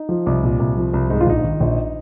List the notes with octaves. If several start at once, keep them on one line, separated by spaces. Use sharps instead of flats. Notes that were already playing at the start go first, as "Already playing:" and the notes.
Already playing: D#4
F3
C2
A#2
C2
F3
C2
G#2 D#4
F4
A#1 D#4
D#3
A#1